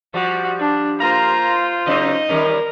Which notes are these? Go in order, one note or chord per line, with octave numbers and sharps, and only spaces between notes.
F3 G3 F#4
D4
A#3 F4 C5 F5 A#5
C#3 F#3 C4 D#4 D#5
D#3 G3 C#4 A#4